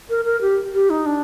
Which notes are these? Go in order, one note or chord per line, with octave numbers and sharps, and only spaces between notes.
A#4
A#4
G4
G4
D#4
D4